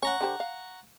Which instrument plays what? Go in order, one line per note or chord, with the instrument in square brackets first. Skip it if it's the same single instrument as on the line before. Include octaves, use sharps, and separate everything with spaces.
[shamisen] C#4 [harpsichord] F#5 A#5 C#6
[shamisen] D3 G4 C5
F5